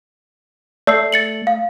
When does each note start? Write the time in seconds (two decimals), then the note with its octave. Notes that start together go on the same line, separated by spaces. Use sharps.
0.87 A3 D5 E6 C7
1.12 A6 C#7 F#7
1.47 F5